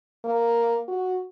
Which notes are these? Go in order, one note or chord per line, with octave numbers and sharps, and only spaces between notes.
A#3
F#4